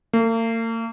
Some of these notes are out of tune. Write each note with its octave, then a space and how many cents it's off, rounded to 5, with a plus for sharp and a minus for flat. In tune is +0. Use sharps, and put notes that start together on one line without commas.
A#3 -45